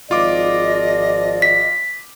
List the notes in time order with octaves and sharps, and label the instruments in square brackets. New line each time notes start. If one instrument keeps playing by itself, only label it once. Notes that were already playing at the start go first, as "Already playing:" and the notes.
[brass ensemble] G#1 F3 D5 [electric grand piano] F4 D6 [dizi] D#5
[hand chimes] B6